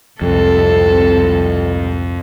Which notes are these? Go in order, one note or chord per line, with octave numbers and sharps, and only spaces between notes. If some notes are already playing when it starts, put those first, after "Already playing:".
C2 F2 G#2 C3 A4